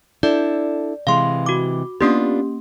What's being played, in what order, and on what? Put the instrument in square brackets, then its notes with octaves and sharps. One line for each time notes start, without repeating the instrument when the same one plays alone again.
[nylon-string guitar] D4 E4 A4 [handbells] D5
[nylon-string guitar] C3 E3 G#3 [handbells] F5 C6
[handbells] F#4 D6
[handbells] A#3 C#4 G4 [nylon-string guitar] B3 D4 F4